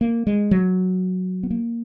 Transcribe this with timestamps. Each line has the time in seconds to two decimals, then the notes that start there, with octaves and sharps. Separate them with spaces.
0.01 A#3
0.27 G#3
0.51 F#3
1.43 B3
1.51 A#3